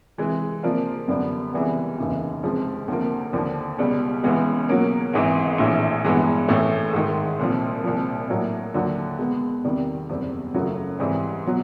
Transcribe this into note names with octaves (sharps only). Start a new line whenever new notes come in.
C3 E3 G#3
C3 F3 A#3 D4 F4
F#2 D3 G3 B3 D4
C#2 C3 E3 G3 B3
F1 D#2 C#3 E3
C#2 C3 F3 G#3
D2 C3 F3 A#3
D#2 D3 F3
C#2 B2 G3
C#2 C#3 E3 G#3 B3
B2 F#3 A#3 C#4
G#1 G#2 E3
A#1 A2 E3
G2 E3 G#3 B3
A1 A2 E3 A3
G#2 D#3 G#3
C2 A#2 F3
C2 A#2 F3
A2 F#3 A#3 D4
D#2 D3 F#3
B2 G#3 B3
E2 C3 D#3 G3
F#1 E2 B2 G3 C4
F#1 F#2 C#3 F#3 A3
G#2 E3 G3 C4
B2 F#3